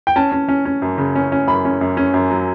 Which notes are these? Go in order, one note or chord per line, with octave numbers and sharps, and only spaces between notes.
G5
C#4 A5
C#4
C#4
C#4
F#2
C#3
C#4
C#4
F#2 B5
C#4
F#2
C#4
F#2
F#3